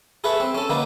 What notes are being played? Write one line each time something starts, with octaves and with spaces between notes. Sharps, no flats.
G#4 A4 B4 E5 C#6
C4
C#4 A4
D3 A#3 B3 D#4